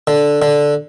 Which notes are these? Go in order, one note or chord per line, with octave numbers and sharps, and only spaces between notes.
D3
D3